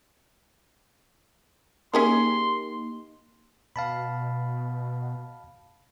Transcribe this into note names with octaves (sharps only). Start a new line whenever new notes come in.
A#3 C#4 D#4 G4 G#4 A#4 C6
B2 F5 A5 B5